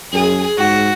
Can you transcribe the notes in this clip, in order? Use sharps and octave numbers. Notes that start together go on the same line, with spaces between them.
F#2 G#4
G#2 F#4